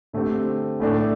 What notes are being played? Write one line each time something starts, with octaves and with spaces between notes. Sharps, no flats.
D3 A3 C4 G4
A2 A3 D4 A4